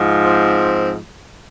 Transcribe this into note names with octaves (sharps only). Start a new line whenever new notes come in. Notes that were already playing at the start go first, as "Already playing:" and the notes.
Already playing: G#2 F3
C4